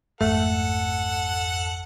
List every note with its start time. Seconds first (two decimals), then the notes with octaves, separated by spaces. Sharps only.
0.21 G#1 F2 G#2 A3 A4 F#5